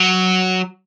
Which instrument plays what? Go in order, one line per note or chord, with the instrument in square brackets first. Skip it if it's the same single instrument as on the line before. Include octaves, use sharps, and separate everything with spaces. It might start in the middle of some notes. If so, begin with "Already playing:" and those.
Already playing: [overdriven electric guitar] F#3